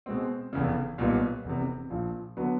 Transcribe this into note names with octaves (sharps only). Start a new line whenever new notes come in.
B2 G#3 C4
F1 E2 C#3
B1 A#2 G3 B3
F1 E2 C3
A#1 A#2 F3
D3 F#3 B3